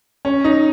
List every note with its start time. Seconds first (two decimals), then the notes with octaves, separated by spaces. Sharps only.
0.25 C#4
0.44 D#4